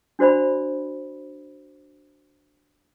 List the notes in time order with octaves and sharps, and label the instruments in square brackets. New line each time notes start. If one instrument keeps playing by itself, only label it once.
[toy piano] D4 F#4 C5 D5 B5